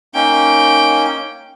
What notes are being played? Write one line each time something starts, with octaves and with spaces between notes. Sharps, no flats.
A#3 C#4 D#4 G5